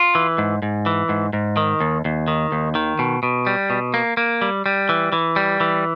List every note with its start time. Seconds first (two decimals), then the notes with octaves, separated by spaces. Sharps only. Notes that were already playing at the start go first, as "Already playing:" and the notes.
Already playing: F4
0.15 E3
0.38 G#2
0.62 G#2
0.86 E3
1.09 G#2
1.33 G#2
1.57 D#3
1.80 D#2
2.05 D#2
2.28 D#3
2.52 D#2
2.75 D#3
2.99 B2
3.23 B2
3.47 G3
3.70 B2
3.94 A#3
4.17 A#3
4.42 G3
4.66 G3
4.89 E3
5.12 E3
5.36 G3
5.60 E3